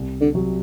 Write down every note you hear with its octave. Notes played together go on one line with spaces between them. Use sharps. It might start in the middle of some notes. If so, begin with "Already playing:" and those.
Already playing: C2
D3
C3 F#3